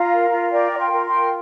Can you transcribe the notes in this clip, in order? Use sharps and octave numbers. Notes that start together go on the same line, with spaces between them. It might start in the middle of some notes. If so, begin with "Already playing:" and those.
Already playing: F4 F5 A#5
A#4
F4
A#4 D5 G5
F4
G5 C6
A#4
G5 C6
F4